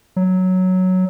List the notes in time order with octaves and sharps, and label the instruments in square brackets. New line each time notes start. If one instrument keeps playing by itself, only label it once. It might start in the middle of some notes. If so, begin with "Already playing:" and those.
[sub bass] F#3